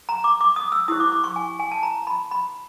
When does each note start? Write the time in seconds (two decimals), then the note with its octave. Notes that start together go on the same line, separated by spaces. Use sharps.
0.09 A#5
0.24 D6
0.41 D6
0.56 D#6
0.72 E6
0.88 E4 G4 C5 D#6
1.00 D6
1.12 D6
1.24 C#6
1.36 G#5
1.60 G#5
1.71 A5
1.83 A#5
2.07 B5
2.31 B5